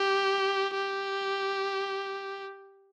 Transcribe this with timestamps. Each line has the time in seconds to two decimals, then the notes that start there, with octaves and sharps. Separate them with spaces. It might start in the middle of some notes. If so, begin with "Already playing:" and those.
Already playing: G4
0.75 G4